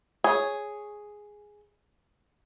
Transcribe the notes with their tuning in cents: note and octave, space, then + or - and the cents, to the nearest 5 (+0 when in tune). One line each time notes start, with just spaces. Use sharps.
G#4 +0 C#5 +0